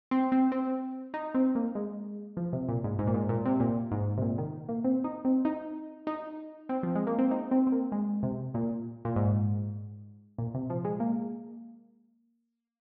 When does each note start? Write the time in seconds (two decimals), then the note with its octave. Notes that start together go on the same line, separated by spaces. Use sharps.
0.11 C4
0.32 C4
0.52 C4
1.14 D#4
1.34 C4
1.55 A#3
1.75 G#3
2.37 F3
2.53 C3
2.68 A#2
2.84 G#2
2.99 G#2
3.07 A#2
3.14 G#2
3.29 A#2
3.46 C3
3.60 A#2
3.91 G#2
4.17 C3
4.22 A#2
4.38 D#3
4.69 A#3
4.84 C4
5.04 D#4
5.25 C4
5.45 D#4
6.07 D#4
6.69 C4
6.83 F3
6.95 G#3
7.07 A#3
7.19 C4
7.31 D#4
7.51 C4
7.67 C4
7.72 A#3
7.92 G#3
8.23 C3
8.54 A#2
9.05 A#2
9.16 G#2
10.38 A#2
10.55 C3
10.70 F3
10.85 G#3
11.00 A#3